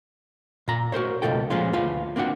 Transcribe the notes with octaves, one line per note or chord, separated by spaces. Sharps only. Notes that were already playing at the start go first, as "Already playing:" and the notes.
A#2 A#5
F#4 A#4 C5 C#5
C#2 G2 B2 F4 A4 G5
A#2 F3 G#3 C#4 F4
D2 F4 B4 F5
A#3 C4 D4 F#4 F#5